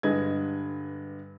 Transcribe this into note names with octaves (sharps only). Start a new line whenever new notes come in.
G2 D3 G#3 B4 D#5 G#6